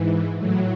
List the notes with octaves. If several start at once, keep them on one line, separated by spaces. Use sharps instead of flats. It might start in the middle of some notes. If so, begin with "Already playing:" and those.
Already playing: G#2 E3
A2 F#3